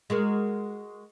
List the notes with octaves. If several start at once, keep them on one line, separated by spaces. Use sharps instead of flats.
G#3 F#4 A#4